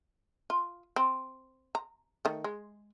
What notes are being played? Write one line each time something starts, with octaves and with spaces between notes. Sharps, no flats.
F4
C4
A#5
D#3 A3
G#3